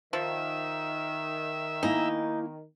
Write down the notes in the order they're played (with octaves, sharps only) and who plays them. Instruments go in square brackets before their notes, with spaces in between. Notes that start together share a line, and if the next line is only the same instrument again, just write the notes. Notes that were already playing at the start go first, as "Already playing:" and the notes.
[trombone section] D#3 [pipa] F3 [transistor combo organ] E5
[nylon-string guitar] A#3 E4 G#5 [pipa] D#4